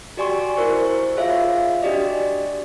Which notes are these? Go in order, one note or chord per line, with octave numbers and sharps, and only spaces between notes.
F#4 G4 D5 G#5 C6 C#6
E4 F#4 A#4 C5 C#6
F4 G#4 C#5 E5 F5
D4 F#4 G4 D5 D#5